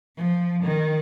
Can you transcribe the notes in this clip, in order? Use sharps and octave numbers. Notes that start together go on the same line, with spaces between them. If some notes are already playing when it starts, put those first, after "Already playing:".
F3
D#3